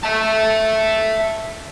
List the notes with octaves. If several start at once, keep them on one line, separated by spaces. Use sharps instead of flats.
E5 A5